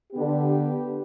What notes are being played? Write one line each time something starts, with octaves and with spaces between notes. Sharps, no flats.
D3 B3 G4